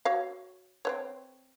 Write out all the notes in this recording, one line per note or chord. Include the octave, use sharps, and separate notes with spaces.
F#4 C#5 F5
C4 B4 C#5